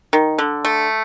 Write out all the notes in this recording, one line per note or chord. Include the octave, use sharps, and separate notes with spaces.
D#3
D3
A3